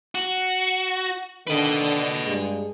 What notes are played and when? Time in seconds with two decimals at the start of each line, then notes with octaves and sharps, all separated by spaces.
0.15 F#4
1.47 D3 D#3 B4 D#5
2.25 G2 G#3